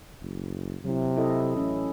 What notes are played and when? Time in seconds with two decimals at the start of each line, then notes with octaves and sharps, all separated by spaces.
0.21 F#1
0.85 C3 F#3 E4
1.17 E4 A4 D#5
1.57 A1 C#4